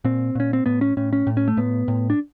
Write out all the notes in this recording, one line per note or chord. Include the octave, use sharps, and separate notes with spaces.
A#2 C4
A#2 C#4
C4
A2 B3
C#4
A2 C#4
C#4
A2
C#4
A3
A2 B3
A2
D4